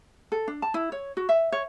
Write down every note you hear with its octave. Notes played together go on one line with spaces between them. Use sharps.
A4
D4
A5
E4
C#5
F#4
E5
C#5